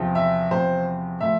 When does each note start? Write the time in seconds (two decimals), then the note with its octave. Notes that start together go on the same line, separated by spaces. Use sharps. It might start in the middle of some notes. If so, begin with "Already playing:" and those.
Already playing: E2 C3 F3
0.15 E5
0.51 E2 C3 F3 C5
1.21 A2 F3 E5